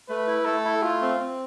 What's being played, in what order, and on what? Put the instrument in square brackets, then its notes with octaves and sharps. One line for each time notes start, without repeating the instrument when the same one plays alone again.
[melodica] A3 [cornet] B4
[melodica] E4
[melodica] A3 [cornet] A4
[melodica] E4
[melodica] A3 [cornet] F4
[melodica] C4
C4